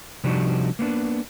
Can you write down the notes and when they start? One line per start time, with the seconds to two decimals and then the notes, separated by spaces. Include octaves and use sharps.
0.24 C3 F3 G3 D4 D#4 F#4
0.79 A#3 B3 D4